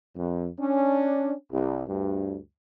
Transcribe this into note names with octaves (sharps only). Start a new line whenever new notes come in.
F2
C#4 D4
C2
D2 G2